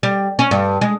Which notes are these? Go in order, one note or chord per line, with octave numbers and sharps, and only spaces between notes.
G3
C#4
G2
G#3